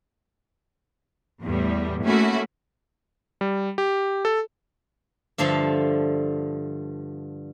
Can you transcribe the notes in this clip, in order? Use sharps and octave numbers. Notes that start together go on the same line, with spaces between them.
E2 A2 G3
A3 A#3 C#4 E4 F#4
G3
G4
A4
G2 D3 F3 A4 E5 F5